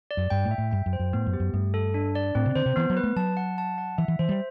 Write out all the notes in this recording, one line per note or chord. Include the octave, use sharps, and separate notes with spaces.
D5
F#2
G2 G5
A2
E5
A2
G2 G5
F#2
C5
F#2
A2 B3
F#2
G4
F#2
G2 A3
A4
D4
D5
A2 C4
C3
D3 C5
C3
E3 B3
F#3
B4
A3
F#3 A5
F#5
A5
F#5
E3 E5
E3
E3 C5
G3